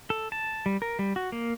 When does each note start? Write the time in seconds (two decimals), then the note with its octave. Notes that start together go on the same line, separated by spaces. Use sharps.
0.10 A4
0.32 A5
0.66 G3
0.82 A#4
0.99 G3
1.16 F#4
1.32 A#3